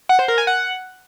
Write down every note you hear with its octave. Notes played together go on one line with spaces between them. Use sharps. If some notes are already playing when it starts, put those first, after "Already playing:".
F#5
C5
A#4
G#5
F#5